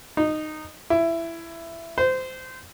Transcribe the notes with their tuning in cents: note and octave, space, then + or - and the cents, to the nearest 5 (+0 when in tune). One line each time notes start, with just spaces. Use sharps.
D#4 -15
E4 +15
C5 -20